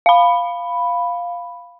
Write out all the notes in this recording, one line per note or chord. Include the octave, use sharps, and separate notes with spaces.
F5 B5